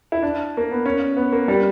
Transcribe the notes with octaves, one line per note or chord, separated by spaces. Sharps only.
E4
D4
A#3
B3
C#4
B3
A#3
G3